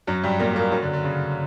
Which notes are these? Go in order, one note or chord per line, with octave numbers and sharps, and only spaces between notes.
F#2 F#3
G2 G3
A#2 A#3
A#2 A#3
F#2 F#3
D3
D3
C#3